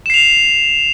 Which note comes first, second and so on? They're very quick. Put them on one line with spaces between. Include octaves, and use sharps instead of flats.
E7 C7 F7